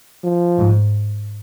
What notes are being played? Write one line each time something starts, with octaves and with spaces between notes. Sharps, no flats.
F3
G#2